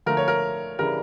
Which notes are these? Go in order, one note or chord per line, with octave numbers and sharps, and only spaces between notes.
D3 F3 A3 A#4
C#5
A#4
C#3 E3 G3 D4 A#4